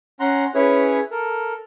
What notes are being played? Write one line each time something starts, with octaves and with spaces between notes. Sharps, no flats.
C#4 F#5 A#5 C6
C#4 E4 G#4 B4 C#5
A4 A#4